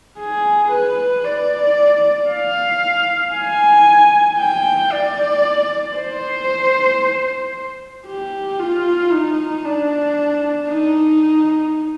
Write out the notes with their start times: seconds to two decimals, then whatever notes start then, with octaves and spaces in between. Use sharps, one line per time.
0.19 G#4
0.71 B4
1.24 D5
2.29 F5
3.34 G#5
4.39 G5
4.92 D5
5.96 C5
8.06 G4
8.59 F4
9.12 D#4
9.64 D4
10.69 D#4